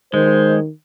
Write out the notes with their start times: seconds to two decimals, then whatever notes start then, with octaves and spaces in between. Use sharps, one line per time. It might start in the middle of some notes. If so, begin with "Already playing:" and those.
0.14 D#3 G#3 C5